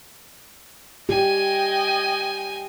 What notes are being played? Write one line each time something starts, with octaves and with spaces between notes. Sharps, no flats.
G4 D#5 G5 G#5